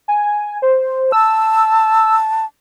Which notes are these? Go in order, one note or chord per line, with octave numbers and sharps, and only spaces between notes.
G#5
C5
A5 E6